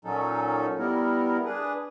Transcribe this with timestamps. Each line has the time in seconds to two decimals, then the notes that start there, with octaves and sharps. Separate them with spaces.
0.05 A#2 F#3 C#4 D#4 A4
0.79 G3 B3 E4 A#4
1.45 D4 G#4 B4